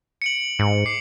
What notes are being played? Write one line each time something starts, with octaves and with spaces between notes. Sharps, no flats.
C#7 D7 F#7
G#2
D6 C7